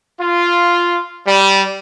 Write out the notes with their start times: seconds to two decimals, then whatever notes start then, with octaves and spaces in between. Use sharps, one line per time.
0.19 F4
1.26 G3